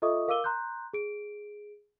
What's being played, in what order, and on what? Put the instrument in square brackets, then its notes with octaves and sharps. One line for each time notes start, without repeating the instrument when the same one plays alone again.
[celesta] F4 A4 D#5 E5 C#6 D#6
A#4 F5 D6 E6 D#7 G7
A#5 C6 F#6 G6
G#4 D7